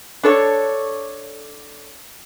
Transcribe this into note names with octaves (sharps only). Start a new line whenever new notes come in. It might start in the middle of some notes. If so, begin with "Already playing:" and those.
D4 A4 C#5